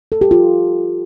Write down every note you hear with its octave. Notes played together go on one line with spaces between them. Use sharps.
A4
G4
F4